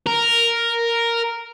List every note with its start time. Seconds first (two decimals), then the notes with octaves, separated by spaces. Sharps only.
0.07 A#4